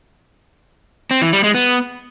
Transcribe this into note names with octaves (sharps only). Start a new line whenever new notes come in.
C4
E3
G3
G#3
B3